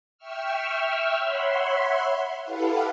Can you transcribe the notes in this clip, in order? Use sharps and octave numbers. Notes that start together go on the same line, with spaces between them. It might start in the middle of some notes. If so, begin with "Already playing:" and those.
E5 G5 C#6 E6 F6
C#5 E5 F#5 B5 C6
E4 G4 A4 B4 F5 F#5